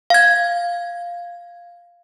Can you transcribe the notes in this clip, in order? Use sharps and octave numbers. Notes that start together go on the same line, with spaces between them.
F5 G#6